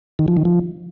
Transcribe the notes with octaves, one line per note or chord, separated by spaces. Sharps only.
D#3
F3
D#3
F3